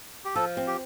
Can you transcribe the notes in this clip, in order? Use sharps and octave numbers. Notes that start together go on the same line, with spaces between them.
G4
F3 A4
C4
G4